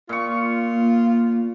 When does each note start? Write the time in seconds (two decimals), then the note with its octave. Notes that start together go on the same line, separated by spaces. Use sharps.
0.09 A#2 F4 C#6
0.74 A#3